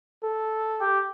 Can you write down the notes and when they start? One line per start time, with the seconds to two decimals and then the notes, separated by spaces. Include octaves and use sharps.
0.23 A4
0.81 G4